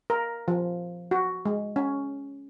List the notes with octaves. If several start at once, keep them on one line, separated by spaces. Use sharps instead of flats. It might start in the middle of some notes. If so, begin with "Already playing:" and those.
A#4
F3
F#4
G#3
C#4